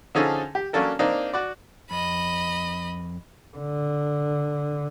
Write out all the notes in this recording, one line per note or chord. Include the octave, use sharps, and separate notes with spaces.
D3 F3 C#4 D#4 G#4 A4
G4
F#3 A#3 C#4 D4 A4 A#4
A#3 C4 D4 D#4
F#4 D5
F2 D#5 B5
D3